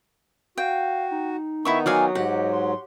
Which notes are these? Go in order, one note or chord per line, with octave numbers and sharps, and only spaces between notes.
F#4 F5 G5
D#4
D#3 B3 D#4 E4 E5 C#6
F#3 D5 F5 G#5 D#6
G#2 F#3 G4 D#5 F#5
C6